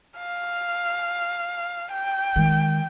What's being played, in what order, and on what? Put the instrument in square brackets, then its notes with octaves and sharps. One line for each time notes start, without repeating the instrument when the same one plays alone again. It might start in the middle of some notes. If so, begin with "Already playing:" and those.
[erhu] F5
G5
[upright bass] D#3 G#3